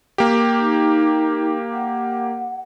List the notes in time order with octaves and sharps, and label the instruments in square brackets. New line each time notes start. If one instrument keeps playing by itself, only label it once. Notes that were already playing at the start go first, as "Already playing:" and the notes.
[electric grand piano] A#3 G4
[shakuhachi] D#4
F#5